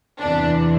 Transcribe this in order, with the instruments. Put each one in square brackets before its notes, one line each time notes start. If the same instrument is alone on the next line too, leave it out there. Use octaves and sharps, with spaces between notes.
[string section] E2 C3 E3 D4